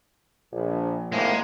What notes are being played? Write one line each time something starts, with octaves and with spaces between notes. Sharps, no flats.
A#1
G#1 A2 G#3 A#3